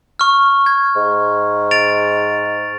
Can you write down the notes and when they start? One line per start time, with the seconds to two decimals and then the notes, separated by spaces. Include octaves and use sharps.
0.19 C#6 F6
0.66 G#6
0.96 G#2
1.71 A6 D7 F7